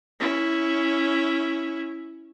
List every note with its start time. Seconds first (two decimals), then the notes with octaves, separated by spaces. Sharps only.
0.20 C#4 E4